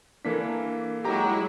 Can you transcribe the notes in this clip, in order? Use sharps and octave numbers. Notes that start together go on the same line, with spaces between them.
E3 A#3 D4 A4 A#4 B6
F#3 G#3 E4 G4 A#5 D6